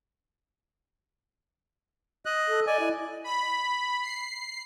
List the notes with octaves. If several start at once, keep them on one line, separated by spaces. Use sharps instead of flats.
D#5 F#6
A4
D5 D#5 G#5
E4
B5
C7